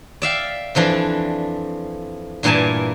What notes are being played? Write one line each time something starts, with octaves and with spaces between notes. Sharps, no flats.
D5 E5 F5 G5
F2 E3 F3 D4 D5
G2 A#2 E3 A#3 G#5 A5